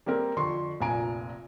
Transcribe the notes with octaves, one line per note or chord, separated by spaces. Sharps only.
G3 A#3 C4 A#4
F2 D3 C6 C#6
F1 A#1 A#2 G#5 A#5 D7